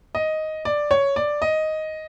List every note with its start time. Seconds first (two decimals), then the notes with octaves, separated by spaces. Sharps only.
0.15 D#5
0.65 D5
0.91 C#5
1.16 D5
1.42 D#5